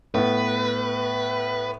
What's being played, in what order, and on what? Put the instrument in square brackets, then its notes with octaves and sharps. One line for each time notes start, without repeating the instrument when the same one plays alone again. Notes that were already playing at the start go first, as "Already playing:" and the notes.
[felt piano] A2 B3 [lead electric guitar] B4